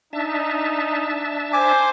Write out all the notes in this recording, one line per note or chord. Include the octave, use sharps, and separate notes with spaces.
D4 D#4 E5 A5
C5 G#5 D6